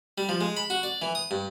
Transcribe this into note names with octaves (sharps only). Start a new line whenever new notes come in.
G3
F3
G#3
B5
F#4
D5
E3
D#6
G2